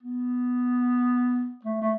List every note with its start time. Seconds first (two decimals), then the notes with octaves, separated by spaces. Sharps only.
0.03 B3
1.65 A3
1.82 A3